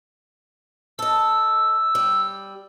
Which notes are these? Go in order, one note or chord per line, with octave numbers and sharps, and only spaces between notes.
A4 D#5 E6
G3